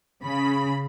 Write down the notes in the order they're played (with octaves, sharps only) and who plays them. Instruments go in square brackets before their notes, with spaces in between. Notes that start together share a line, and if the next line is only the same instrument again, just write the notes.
[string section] C#3 B5